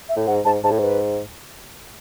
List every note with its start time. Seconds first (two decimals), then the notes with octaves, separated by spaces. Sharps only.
0.09 E5
0.16 A2
0.27 G#2 F#5
0.45 G#2 A5
0.64 G#2 A5
0.71 A2
0.79 G#2 B4